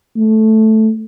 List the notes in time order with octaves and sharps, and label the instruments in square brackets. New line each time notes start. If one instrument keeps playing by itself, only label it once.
[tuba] A3